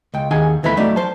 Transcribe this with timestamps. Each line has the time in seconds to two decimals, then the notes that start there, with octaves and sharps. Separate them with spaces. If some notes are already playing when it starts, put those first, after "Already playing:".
0.14 C#2 G5
0.31 D#2 D#3 D#4 G#4 F#5 G#5
0.63 D#2 E3 A3 G#4 B5
0.77 F#3 A3 D#4 D5
0.96 C5 A5